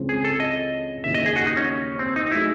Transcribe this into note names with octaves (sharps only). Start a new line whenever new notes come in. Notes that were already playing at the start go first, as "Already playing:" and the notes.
Already playing: C#2 C#3 E3 C4
G#4
A4
D#5
D#2 C#3 E3 E5
D#5
G#4
F#4
D#4
C#4
C4
D#4
F#3 A3 D#4 E4 G#4